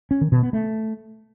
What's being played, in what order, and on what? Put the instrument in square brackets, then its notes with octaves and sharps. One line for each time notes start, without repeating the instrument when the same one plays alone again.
[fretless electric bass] C#4
D#3
B2
B3
A3